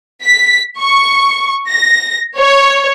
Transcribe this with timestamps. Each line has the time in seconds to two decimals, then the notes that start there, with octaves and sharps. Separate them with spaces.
0.23 B6
0.79 C#6
1.68 A#6
2.38 C#5